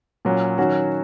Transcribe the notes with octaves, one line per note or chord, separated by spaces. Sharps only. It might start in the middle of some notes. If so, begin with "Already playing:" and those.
A#2 F#3 C#4
D#3 F#3 C#4 F#4